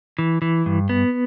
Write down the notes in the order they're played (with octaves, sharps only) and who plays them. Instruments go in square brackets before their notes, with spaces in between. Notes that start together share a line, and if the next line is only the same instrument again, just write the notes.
[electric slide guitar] E3
E3
G2
B3